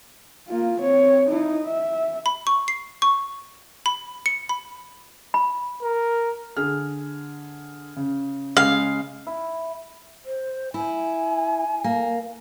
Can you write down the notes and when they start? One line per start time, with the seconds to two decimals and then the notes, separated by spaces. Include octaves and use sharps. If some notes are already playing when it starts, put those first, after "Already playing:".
0.48 A#3 F4
0.80 C4 C#5
1.28 D#4 E4
1.65 E5
2.26 B5
2.47 C#6
2.68 C7
3.02 C#6
3.86 B5
4.26 C#7
4.49 B5
5.34 B5
5.82 A#4
6.57 D3 G#4 F6
7.96 C#3
8.57 C#3 G#3 F5
9.27 E4
10.25 C5
10.74 E4 G#5
11.84 A#3